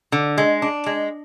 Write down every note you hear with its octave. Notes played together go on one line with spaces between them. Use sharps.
D3
G#3
D4
G#3